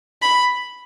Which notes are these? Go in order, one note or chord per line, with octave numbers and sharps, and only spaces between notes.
B5